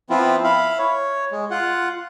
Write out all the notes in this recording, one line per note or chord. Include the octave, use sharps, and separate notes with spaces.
F3 B3 C4 E4 F4
E4 F5 B5
C#5
G#3
F4 F#5